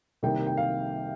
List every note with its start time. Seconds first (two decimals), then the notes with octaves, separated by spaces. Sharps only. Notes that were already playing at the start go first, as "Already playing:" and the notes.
0.23 C2 C3 D#3 G3 A#3 G5
0.46 G5
0.57 F5